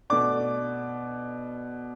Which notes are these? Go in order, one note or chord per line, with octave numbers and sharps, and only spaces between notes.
B2 A3 D4 D6